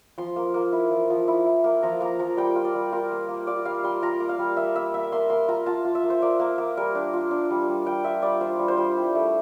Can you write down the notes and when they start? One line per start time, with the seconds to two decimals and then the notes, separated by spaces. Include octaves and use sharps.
0.18 F3 C6
0.36 A#3
0.54 A#3
0.72 E4
0.91 F3
1.10 F3
1.28 E4
1.46 E4
1.64 A#3
1.83 F3 A#5
2.00 A#3 A#5
2.19 F3 A#5
2.37 G3 G5
2.56 F4
2.65 D5
2.75 G3
2.92 F4 A#4
3.11 A#3
3.29 A#3
3.47 F4 D5
3.65 G3 F5
3.84 G3 C6
4.02 F4 A#5
4.20 A#3
4.29 F5
4.39 G3
4.57 A#3 E5
4.76 A#3 E5
4.94 A#3 E5
5.12 A#3 C6
5.30 A#3 C6
5.48 F4 A#5
5.66 F4 A5
5.85 F4
5.95 E5
6.04 A#3
6.10 C5
6.22 A#3 D5
6.40 A#3
6.58 A#3
6.77 G3 A#4
6.95 D4
7.14 F4
7.31 D4
7.50 G3
7.69 G3
7.86 G3 G5
8.04 F4 E5
8.22 G3 D5
8.41 F4 C5
8.59 G3
8.68 C5
8.77 G3
8.96 E4
9.15 A3